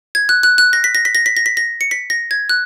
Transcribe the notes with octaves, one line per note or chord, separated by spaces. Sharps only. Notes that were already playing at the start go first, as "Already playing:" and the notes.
G#6
F#6
F#6
F#6
A#6
B6
A#6
B6
A#6
B6
A#6
B6
A#6
C#7
B6
A#6
G#6
F#6